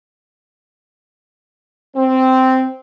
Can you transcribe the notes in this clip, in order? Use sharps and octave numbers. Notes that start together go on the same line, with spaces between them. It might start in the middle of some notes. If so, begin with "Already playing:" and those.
C4